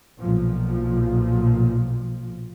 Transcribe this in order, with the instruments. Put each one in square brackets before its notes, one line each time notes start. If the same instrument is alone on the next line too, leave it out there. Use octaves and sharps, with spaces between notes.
[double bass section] B1 A#2 F3